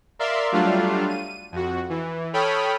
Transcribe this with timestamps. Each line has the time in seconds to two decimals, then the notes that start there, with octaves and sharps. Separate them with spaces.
0.19 A#4 D5 E5 F5 C6
0.52 F#3 G3 A3 D4 F4 F5
1.09 D#7
1.52 F2 F#4
1.90 E3
2.33 A4 C#5 G5 B5 D#6 F6